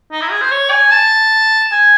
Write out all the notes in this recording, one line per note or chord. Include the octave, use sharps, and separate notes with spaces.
D#4
E4
G#4
C5
C#5
G#5
A5
G#5